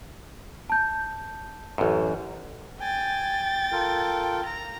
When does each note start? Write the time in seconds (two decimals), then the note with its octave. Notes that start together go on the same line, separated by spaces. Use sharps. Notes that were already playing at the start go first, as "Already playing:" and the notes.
0.70 A5 G6
1.78 A1 F#2
2.81 G5 G#5 A6
3.72 F4 A4 A#4
4.46 A#5